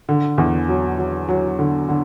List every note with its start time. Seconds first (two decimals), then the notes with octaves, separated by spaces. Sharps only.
0.09 D3
0.38 E2
0.69 F#3
0.98 F#3
1.29 F#3
1.59 D3
1.88 D3